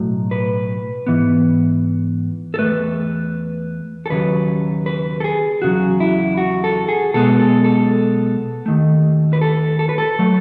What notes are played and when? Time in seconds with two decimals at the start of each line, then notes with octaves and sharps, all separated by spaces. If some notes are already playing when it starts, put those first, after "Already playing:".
Already playing: B1 A2 F#3 A3
0.31 B4
1.07 G#2 E3 B3
2.54 A4
2.59 E2 B2 A3 B4
4.06 A4
4.10 D#2 C#3 F#3 B4
4.86 B4
5.20 A4
5.24 G#4
5.62 E2 C#3 F#3 F#4
6.00 E4
6.37 F#4
6.64 A4
6.89 G#4
7.14 B1 B2 G#3 B3 A4
7.40 A4
7.64 A4
8.66 D#2 D#3 A3
9.33 B4
9.41 A4
9.79 A4
9.89 B4
9.98 A4
10.19 F#3 A3